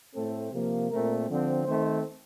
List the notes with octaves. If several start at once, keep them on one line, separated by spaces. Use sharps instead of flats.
A2 A3 C4 A4
C3 F3 A#3
A#2 A3 C4 A#4
D3 F3 C4
D#3 A3 C4 C5